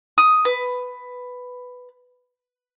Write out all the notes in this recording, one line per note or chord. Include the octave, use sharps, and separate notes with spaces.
D#6
B4